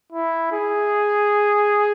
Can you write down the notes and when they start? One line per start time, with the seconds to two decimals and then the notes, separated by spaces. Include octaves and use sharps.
0.12 E4
0.53 G#4